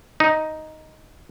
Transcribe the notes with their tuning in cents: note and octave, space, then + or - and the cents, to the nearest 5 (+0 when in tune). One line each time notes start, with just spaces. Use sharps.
D#4 +5